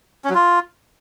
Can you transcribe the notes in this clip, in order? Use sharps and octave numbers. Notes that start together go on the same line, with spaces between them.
C#4
F#3
F4